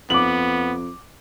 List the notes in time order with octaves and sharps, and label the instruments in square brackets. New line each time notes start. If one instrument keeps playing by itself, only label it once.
[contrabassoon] F2 [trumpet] B3 [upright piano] D6 F#7